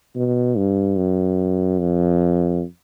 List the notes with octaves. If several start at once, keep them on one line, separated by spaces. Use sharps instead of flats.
B2
G2
F#2
F2